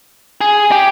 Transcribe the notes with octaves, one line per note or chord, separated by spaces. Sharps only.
G#4
G4